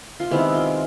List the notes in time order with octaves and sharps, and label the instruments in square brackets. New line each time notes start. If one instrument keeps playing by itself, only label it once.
[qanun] F4
C3 D#3 G#3 B3 E4
F4